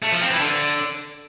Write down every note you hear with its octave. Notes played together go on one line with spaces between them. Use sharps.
A3
F3
C4
E3
D3